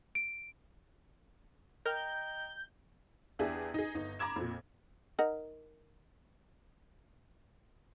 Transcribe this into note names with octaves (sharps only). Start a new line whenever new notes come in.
D7
A#4 D#5 G5 A#5 F6 G6
E2 D4 G4 G#4 E5
D#4 G#4
G1 D#4
A#5 B5 D6 G#6 E7
F2 A#2
D#4 A#4 F#5